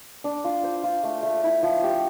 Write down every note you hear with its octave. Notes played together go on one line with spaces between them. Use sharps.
D4
F4
C5
F4
A3
A3
E4
F3
G4